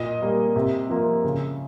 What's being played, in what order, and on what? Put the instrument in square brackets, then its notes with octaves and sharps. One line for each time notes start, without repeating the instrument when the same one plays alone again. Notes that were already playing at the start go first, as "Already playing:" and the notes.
Already playing: [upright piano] A#2 D#5
G3 A#3
C3
F3 A#3
C#3